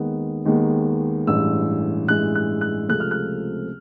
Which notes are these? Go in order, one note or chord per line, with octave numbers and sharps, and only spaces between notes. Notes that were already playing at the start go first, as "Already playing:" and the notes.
Already playing: D#2 D#3 G#3 B3
D#2 D#3 G#3 B3
A1 G2 E3 G#3 E6
A1 G2 E3 G#3 F#6
F#6
F#6
C#2 C3 F3 A3 C4 F#6
F6
F#6